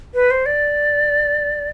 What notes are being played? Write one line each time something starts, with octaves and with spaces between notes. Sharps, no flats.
B4
C5
D5